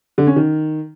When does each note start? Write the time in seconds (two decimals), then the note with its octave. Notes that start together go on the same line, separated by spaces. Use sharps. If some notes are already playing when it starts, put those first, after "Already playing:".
0.18 D3
0.27 C#4
0.36 D#3